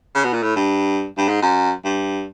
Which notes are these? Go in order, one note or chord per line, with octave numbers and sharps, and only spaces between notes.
C#3
B2
A#2
A2
G2
G2
G#2
F#2
G2